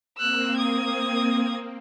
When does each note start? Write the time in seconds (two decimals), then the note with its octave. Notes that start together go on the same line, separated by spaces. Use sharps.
0.19 A#3 C4 E6 F#6
0.57 D#6 G#6